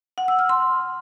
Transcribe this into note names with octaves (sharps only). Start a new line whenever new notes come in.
F#5
E6
F6
C6